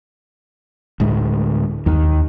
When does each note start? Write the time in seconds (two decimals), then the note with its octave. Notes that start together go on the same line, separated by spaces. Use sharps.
1.00 D2 A2 G#3
1.86 D#2 D#3